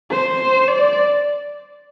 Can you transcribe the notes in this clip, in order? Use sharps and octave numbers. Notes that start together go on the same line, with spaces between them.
C5
D5